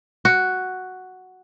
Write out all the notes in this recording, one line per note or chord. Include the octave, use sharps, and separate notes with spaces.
F#4